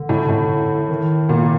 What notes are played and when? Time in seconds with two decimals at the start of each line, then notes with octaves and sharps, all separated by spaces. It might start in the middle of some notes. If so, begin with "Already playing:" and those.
Already playing: D3
0.09 A2
0.29 A2
0.89 D#3
1.29 A#2